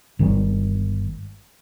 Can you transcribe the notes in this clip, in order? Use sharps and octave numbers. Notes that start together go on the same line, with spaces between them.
G1 D#3 G3 G#3